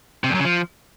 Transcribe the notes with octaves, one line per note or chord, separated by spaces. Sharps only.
C3
E2
F#2
C#3
F3